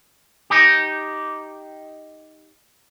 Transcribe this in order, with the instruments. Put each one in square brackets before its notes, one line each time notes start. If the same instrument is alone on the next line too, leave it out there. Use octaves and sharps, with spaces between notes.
[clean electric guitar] D#4 G4